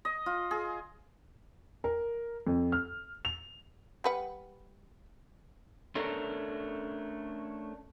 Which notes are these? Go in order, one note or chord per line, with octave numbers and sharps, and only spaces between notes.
D#5
F4
G#4
A#4
F2
F6
F7
G3 B4 F#5
A3 C#4 D4 A4 A#4